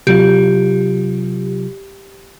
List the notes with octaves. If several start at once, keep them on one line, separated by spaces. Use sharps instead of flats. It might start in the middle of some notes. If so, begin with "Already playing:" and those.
C3 F#3 F4 G4